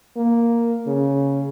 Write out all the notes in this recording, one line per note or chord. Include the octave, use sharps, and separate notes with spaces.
A#3
C#3